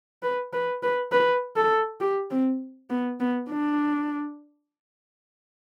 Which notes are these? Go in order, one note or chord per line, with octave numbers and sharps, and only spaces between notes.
B4
B4
B4
B4
A4
G4
C4
B3
B3
D4